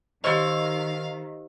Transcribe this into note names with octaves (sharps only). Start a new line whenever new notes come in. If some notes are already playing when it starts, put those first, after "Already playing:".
D#3 G4 C5 D#5 F5 C#6 E6